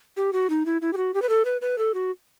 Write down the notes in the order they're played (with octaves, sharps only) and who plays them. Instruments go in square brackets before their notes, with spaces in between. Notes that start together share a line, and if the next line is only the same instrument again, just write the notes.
[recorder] G4
F#4
D#4
E4
E4
G4
F#4
G4
B4
A4
B4
B4
A4
F#4